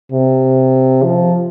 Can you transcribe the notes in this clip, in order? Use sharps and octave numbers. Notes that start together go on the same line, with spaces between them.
C3
F3